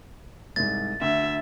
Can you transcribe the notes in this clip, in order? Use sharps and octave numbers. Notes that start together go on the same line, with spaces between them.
C2 G#2 A6
D2 E5